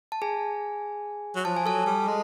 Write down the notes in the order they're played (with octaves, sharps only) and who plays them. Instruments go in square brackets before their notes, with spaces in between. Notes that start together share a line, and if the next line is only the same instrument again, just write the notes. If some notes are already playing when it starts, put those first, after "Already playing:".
[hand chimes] A5
G#4 G#5
[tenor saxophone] F#3
[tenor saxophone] F3 [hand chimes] A5
[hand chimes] G#5
[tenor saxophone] F#3 [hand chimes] A4 A5
[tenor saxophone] G3
G#3